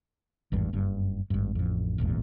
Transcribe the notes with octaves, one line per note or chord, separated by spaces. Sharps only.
G#1 E2 G2
F#1 G2
G#1 G2
A1 F2
D#1 G#1 E2 A#2